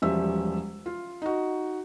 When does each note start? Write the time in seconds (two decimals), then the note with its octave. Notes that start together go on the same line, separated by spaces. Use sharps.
0.02 E1 F3 G3 C#4 E5 E6
0.86 F4
1.22 D#4 F#4